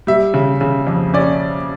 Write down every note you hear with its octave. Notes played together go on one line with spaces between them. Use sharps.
G3 E5
C#3
C#3
F2
C#4 D5